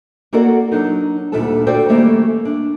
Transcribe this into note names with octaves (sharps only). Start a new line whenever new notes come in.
A#3 F#4 A4 A#4 D5 F#5
F#3 D4 D#4
D2 A#2 G3 D4 A4 A5
F#4 A4 C5 D5 F5 G5
D#3 G3 A3 A#3 C#4 A4
D4